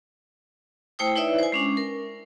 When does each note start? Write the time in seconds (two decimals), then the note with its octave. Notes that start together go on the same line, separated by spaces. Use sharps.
0.99 A3 E4 C5 G5 D#6
1.16 D#4 E4 B4 C#5 D5 E5
1.38 C5 G#5
1.52 G#3 C#4 D4
1.77 A#4